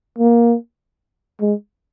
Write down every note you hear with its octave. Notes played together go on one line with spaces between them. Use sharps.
A#3
G#3